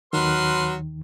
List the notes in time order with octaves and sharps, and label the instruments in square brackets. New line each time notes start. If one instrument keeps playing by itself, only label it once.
[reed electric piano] D#2 D#3 [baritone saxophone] F#3 [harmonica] B4 C6 F6